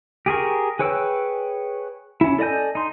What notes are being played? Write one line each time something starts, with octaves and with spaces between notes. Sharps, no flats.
G4 G#4 A#4 C#6
G#4 B4 C#5 G5 E6
C#4 E4
A4 D5 D#5 G#5 G6
D#4 C6